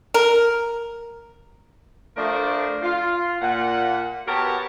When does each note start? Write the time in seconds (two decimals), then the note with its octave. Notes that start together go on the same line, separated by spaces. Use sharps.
0.14 A#4
2.17 F3 A3 D4 A#4 C5 D5
2.82 F4
3.41 A#2 F#5
4.27 B3 F#4 G4 A#4 C#5 A5